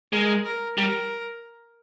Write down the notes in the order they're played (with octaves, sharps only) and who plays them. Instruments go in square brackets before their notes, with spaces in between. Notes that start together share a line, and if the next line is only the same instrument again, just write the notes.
[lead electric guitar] G#3 [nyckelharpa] A#4
[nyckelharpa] A#4
[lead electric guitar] G3 [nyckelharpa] A#4